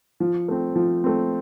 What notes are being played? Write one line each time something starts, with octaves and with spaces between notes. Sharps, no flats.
F3
A3 C4
F3
A3 C4